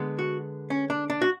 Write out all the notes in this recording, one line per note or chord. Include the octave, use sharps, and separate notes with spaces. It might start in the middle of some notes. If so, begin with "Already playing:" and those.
Already playing: D3 G#3 B3
F#4
C#4
D4
D4
F#4